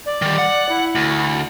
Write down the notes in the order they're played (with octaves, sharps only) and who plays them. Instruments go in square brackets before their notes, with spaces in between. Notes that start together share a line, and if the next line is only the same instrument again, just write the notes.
[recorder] D5
[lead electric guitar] D#3 G3
F#5
[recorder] E4
[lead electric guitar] D2